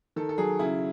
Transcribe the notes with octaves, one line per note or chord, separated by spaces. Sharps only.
D#3 A4
A4
F#3 G#4
C#3 E4